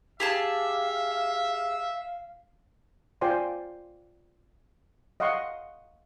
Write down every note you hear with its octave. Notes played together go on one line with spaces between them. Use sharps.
G4 G#4 E5 F5 A5
F4 C5 D5 G5 G#5 C6
D#5 F5 F#5 C6 C#6